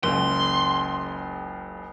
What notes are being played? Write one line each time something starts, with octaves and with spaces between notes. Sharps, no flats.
F#1 C#2 C#3 C6